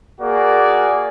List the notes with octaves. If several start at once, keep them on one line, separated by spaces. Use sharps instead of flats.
A#3 F#4 G#4 D5 G#5